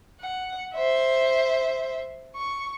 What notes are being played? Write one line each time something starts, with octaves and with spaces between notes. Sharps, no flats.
F#5
C5 E5
C#6